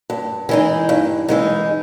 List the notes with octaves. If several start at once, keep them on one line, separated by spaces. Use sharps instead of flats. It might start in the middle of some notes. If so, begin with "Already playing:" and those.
G2
E3 G#3 D#4
G2
E3 G#3 D#4